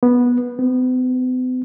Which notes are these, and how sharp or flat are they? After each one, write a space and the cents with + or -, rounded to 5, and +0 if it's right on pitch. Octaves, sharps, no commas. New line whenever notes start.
B3 -15
B3 +45